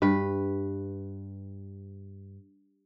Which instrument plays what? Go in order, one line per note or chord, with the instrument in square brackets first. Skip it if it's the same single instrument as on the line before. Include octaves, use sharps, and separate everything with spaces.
[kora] G2 B4